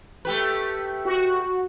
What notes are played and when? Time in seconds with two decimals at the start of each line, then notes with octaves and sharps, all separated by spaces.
0.25 A3 G4 B4
1.05 F#4